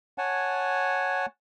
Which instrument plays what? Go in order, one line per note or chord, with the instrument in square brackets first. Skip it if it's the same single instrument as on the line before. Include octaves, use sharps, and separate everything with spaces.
[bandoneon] C#5 F#5 G#5 A5